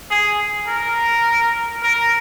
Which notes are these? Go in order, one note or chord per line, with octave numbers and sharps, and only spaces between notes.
G#4
A#4
A#4